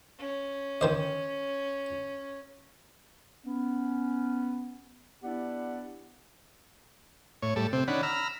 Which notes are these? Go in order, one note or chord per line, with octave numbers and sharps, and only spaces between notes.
C#4
D#3 C5 D#5
B3 C#4
B3 D4 E4 G4 D5 F#5
A2 C#5
A2 G3 A4
C3 C4
D#3 C#4 D4 F#5 B5
A#5 B5 E6 F6